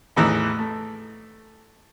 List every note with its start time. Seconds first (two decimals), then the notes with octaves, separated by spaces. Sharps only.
0.16 A1 E2 A2 E3 D#4 A#5
0.59 A3